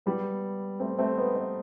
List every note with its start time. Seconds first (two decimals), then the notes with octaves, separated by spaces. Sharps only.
0.06 G3 B3
0.80 A3 C4
0.98 A3 C4
1.17 B3 D#4
1.35 B3 D#4